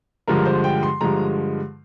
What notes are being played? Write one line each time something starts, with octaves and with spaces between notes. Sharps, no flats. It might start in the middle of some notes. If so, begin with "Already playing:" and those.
G2 D3 F3 G#3 A#4
C5
G5
C6
G2 D3 F3 G#3 A#5